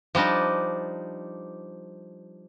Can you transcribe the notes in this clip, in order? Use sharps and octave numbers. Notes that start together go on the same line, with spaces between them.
F3 G3 D4 D#4